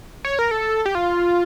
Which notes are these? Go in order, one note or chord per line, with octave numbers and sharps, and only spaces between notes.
C#5
A#4
A4
G4
F4